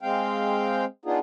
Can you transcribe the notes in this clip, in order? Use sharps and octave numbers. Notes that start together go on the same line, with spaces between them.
G#3 C4 F5 G5
B3 D4 D#4 F4 G#4